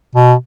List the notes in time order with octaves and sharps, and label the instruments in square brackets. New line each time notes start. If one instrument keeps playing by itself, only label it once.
[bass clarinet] B2